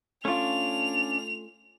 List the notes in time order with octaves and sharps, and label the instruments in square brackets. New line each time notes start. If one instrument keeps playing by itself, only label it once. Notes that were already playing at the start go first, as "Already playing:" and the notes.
[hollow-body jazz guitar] A3 F4 [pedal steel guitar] C#4 D4 [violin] F7